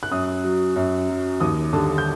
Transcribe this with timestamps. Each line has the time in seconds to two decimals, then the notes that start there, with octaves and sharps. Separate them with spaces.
0.03 F#6
0.11 F#2 D#6
0.44 F#3
0.76 F#2
1.09 F#3
1.40 D#2 D#6
1.73 D3 G3 A5
1.98 G6